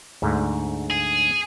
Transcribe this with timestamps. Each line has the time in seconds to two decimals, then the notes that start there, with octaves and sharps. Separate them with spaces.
0.22 D2 G#2 D3
0.90 G#4